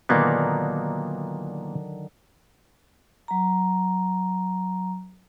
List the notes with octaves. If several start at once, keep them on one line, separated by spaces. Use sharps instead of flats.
A#2 D3 D#3 F#3 A#3 B3
F#3 A#5